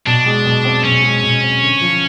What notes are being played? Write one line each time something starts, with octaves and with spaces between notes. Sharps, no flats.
B2 D4
G#3
B2
C4
B2 C#4
G#3
B2
C4
D3
F3